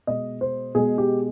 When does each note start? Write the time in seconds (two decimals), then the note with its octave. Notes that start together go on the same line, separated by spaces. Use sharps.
0.07 B2 G#3 D#5
0.41 C5
0.75 B2 G#3 G#4
0.98 G4